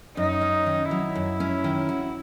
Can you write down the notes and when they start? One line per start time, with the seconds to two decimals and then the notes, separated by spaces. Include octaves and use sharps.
0.17 F#2 D#4
0.41 C#4
0.66 D#3
0.91 F#3 E4
1.15 F#2
1.40 C#4
1.64 D#3
1.89 F#4